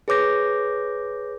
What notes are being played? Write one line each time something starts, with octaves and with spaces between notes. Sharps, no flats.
G#4 B4 C#5 D6 G6 A#6